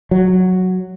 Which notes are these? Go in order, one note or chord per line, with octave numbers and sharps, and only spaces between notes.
F#3